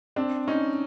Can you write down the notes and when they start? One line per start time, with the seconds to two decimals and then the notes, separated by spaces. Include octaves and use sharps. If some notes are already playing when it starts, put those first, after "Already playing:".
0.16 C4 D4
0.48 C#4 D#4